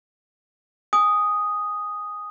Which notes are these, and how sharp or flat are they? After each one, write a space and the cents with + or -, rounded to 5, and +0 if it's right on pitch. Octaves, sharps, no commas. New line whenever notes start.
G#5 -15 D#6 +0